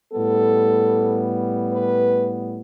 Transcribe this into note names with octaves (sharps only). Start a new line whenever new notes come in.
A2 G3 B3 A4
B4